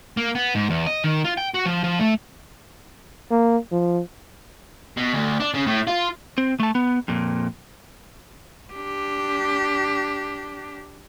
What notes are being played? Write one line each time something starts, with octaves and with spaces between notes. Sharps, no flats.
A#3
B3
G#2
E2
D#5
D#3
F4
G5
F#4
F3
F3
A3
A#3
F3
B2
D2
D4
C#3
A2
F4
C4
A3 A5
B3
F2 A#2
D4 G4